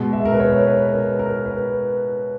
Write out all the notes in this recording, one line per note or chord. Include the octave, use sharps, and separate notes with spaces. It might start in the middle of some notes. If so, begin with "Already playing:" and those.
Already playing: B2 G#3
E5
A#4
B4
C#5
B4
A#4
A#4
B4